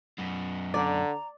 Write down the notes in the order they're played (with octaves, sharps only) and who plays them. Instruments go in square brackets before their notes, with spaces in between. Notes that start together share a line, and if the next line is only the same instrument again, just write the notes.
[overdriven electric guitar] F#2 B3
[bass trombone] D3 [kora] D5 [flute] A#5